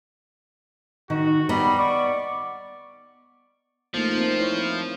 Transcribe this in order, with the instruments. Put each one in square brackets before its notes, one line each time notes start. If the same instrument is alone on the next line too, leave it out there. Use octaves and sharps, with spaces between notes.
[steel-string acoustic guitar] D#3 [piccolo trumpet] F#4
[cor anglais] G3 [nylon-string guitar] B3 D#5 [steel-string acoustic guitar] A#5 [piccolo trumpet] B5
[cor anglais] D5 [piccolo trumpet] C#6
[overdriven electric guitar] F3 [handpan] A3 A#3 D#4
[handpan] A#3 C4
E4 C5 C#5